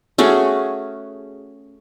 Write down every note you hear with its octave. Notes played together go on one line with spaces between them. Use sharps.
A3 C#4 F#4 G#4